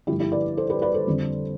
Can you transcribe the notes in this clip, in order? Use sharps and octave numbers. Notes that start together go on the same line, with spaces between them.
G2 D3 F3 A3 E4 G4
E4 G4
B4 D5
A4 C5
G4 B4
B4 D5
A4 C5
F2 D3 G3